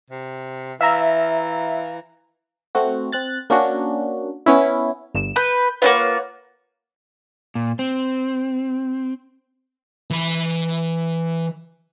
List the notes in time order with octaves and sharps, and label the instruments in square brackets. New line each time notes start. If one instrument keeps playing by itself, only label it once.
[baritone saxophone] C3
[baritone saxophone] E3 [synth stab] E5 [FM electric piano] F5 A#5
[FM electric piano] A3 C4 F#4
C4 F#6 A6
A#3 C#4 D4 F#4
B3 C#4 E4
[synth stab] G1 G2 E7
[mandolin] B4 [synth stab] G6
[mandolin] A#3 C4 F4 [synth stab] B4 C#5 F#5
[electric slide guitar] A#2
C4
[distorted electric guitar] E3 B5